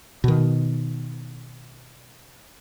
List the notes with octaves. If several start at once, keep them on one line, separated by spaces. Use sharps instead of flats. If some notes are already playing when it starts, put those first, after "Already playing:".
B2 D#3